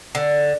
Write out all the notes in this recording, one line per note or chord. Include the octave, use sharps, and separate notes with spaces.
D3